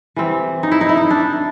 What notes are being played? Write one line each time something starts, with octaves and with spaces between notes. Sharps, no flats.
E3 G3 C4
D#4
E4
D#4
E4
D#4
D4